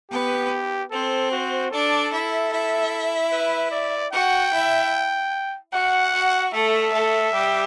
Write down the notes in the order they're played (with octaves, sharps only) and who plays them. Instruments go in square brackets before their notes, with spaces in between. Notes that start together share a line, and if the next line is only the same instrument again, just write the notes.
[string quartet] B3 B4 [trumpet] G4
[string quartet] C4 C5 [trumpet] A4
[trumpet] F#4
[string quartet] D4 D5 [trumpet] A4
[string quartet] E4 E5
E4 E5
[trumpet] B4
D5
[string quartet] F#4 F#5 [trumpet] G5
[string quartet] E4 E5
[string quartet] F#4 [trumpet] F#5
[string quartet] F#4
[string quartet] A3 A4 [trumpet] E5
[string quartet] A3 A4
G3 G4